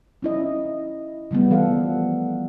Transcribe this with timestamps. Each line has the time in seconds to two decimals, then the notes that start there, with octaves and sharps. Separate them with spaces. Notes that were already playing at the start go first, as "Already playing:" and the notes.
0.22 C#4 E4 D#5
1.31 C#3 G3 A3 B3
1.50 E3 F3 A4 F5 F#5